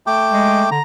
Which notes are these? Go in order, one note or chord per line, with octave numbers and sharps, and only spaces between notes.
A3 G5 D6
G#3
D3 A#5